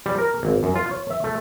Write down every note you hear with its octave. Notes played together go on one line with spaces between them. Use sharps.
G3
A#4
G#1
F#2
F4
C#5
E5
A3